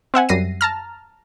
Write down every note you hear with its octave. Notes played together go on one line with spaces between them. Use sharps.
C4 E5 F#5 G#5
F#2 G3 A#6 C7 D#7
A5 A#5 F6